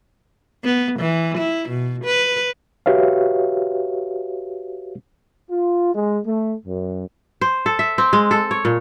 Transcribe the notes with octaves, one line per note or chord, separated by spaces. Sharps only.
B3
E3
E4
B2
B4
F#4 G4 B4 C#5 E5 F5
F4
G#3
A3
F#2
C5
A4
E5
C4
G#3
A4
C#5
A#2